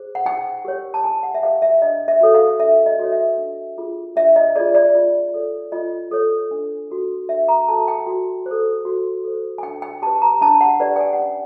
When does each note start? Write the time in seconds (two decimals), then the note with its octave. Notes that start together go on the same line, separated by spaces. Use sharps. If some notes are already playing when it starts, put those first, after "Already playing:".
Already playing: G#4 C5
0.15 F#5
0.26 D#4 G5
0.65 G4 A#4 C#5
0.94 A5
1.04 D#4 G#5
1.23 F#5
1.35 E5
1.43 G4 A#4 C#5 F5
1.62 E5
1.82 D4 D#5
2.08 E5
2.20 F#4 A4 C#5
2.34 F5
2.60 D4 E5
2.86 D#5
2.99 F#4 A4 C#5
3.12 E5
3.38 D4
3.78 F4 G#4
4.16 D4 E5
4.36 D#5
4.56 F4 G#4 D5
4.75 D5
4.95 F4
5.34 A4 C#5
5.72 F4 D#5
6.11 A4 C#5
6.51 D4
6.90 F#4 A4
7.29 D4 E5
7.48 A#5
7.68 F#4 A4 A5
7.88 G5
8.07 F#4
8.46 C5
8.51 A4
8.85 F#4
9.24 A4 C5
9.58 G#5
9.63 D4 G5
9.82 G5
10.02 G4 B4 A5
10.22 A#5
10.41 D4 A5
10.61 F#5
10.80 G4 B4 D5
10.96 G5
11.00 G#5
11.13 F#5
11.19 C#4 G5